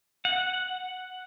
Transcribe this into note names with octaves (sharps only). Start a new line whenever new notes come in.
F#5